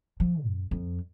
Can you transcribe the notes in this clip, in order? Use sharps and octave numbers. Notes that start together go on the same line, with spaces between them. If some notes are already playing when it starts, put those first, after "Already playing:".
F3
F#2
F2